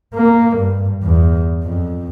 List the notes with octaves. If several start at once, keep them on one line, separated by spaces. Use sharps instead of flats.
A#3
G2
E2
F2